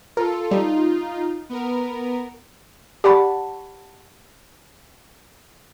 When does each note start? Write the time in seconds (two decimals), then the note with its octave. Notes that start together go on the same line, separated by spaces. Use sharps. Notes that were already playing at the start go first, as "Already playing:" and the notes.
0.17 F4 A4 A#4
0.51 G3 D#4 F4
1.49 B3 A#4
3.04 G4 D5 F#5 A5 B5 C#6